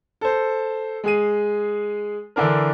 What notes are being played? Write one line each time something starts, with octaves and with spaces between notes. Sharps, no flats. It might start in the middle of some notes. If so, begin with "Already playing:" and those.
A4 C5
G#3 G#4 D#7
D3 E3 D4 A#4